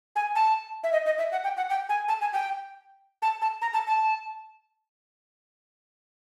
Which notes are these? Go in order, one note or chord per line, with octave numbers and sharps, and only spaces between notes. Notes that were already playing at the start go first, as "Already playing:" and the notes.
G#5
A5
E5
D#5
D#5
E5
F#5
G5
F#5
G5
G#5
A5
G#5
G5
A5
A5
A#5
A5
A5